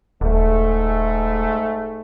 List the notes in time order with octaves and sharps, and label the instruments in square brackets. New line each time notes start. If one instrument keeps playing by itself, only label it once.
[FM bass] D#1 [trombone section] G#2 G#3 A3